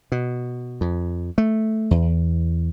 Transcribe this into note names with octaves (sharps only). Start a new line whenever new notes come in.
B2
F2
A3
E2